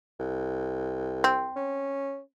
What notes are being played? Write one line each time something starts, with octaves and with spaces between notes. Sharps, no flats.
C2
C4
C#4